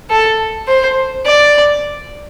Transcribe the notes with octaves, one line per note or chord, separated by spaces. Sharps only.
A4
C5
D5